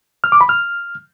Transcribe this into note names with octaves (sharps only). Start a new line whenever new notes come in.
F6
D6
B5
F6